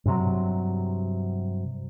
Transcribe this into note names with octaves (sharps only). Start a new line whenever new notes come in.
G2 C3 F#3